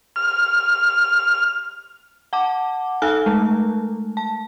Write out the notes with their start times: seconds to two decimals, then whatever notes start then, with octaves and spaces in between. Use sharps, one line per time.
0.16 F6
2.33 F#5 A5 D6
3.02 D#4 A4 G#5 F6 F#6
3.26 G#3 A3
4.17 A5